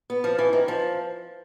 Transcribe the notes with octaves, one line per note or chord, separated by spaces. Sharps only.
B3
F3
E3
D#3
F3